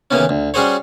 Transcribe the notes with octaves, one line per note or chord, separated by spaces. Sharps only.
D#2 C#3 E3 A#3 B3 C#4
D2
G3 C#4 F#4 G#4 C5 C#5